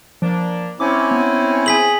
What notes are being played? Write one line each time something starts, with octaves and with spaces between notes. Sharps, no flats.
F3 A#3 D4
C4 C#4 E4 D6
B3
G#4 G#5 B6 F#7